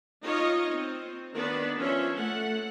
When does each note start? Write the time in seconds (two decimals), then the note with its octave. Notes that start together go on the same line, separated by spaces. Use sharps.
0.22 D#4 F4 C#5 D#5
0.71 C4
1.35 D#3 B3 D4 B4 D5
1.76 F3 C#4 C#5 E5
2.14 A3 F#5